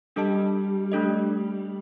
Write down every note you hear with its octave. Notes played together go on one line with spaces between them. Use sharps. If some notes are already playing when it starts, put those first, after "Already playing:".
G3 D4 A4 D#5 A5
A3 D4 A4 D#5